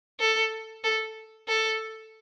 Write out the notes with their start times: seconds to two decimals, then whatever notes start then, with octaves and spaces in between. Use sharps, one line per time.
0.20 A4
0.84 A4
1.48 A4